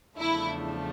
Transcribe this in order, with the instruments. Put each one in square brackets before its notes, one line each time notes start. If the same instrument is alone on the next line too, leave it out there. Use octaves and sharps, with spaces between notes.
[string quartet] E2 C#3 F3 A3 D4 [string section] E4